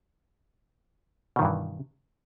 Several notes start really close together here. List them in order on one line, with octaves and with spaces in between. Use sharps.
B2 D#3 G2 E3